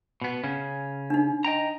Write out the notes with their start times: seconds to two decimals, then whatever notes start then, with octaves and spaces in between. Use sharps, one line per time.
0.21 B2 B3
0.44 C#3 C#4
1.10 D4 D#4
1.44 D#5 G5 A#5